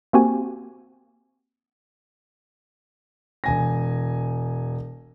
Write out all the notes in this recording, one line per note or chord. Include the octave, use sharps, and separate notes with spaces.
A#3 C4 F#4 G4 G#5
E1 G#5 A#6